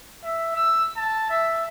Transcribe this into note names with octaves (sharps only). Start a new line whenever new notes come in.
E5
E6
A5
E5